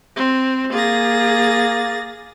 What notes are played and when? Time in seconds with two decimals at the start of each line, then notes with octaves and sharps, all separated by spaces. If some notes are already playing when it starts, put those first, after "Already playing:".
0.15 C4
0.72 A#3 G#4 A6 A#6